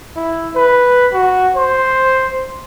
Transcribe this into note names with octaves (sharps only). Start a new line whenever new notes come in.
E4
B4
F#4
C5